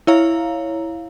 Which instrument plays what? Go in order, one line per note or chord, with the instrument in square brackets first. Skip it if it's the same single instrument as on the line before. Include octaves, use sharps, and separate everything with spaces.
[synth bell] E4 C#5 F5 A#5